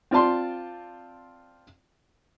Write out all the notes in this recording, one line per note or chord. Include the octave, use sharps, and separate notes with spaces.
C4 F4 D5 A5 C6